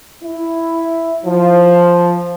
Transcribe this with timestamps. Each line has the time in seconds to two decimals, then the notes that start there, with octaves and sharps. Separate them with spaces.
0.23 E4
1.25 F3